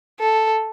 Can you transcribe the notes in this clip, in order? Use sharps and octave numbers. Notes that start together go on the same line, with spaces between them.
A4